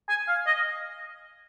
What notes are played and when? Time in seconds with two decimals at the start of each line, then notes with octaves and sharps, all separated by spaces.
0.09 G#5
0.28 F5
0.46 D#5